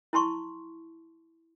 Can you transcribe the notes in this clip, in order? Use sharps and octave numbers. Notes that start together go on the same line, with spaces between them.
E4 A5 C6 C#6